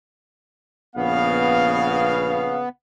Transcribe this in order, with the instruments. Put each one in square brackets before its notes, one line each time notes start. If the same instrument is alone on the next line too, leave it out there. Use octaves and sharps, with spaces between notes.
[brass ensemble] A#1 C#3 F5 [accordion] B3